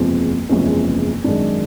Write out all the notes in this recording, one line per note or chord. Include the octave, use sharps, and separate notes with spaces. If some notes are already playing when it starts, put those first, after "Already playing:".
Already playing: F#1 E2 C3 F3 G#3 C4
F#1 E2 C3 F3 G#3 C#4
G#1 F#2 D#3 G#3 D4